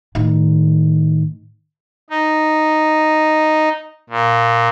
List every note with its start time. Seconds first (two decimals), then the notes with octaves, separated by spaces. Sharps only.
0.15 A2 D#3
2.10 D#4
4.10 A#2